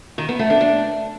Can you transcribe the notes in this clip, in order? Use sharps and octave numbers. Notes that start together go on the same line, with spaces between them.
D#3
B3
A3
D4
D4